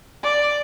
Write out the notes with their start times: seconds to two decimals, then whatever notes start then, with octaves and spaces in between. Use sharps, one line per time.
0.23 D5